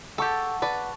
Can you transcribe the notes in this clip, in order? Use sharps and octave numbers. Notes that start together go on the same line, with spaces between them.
G4 A4 F#5 A5 C#6 E6
B4 D5 A5 C#6 D#7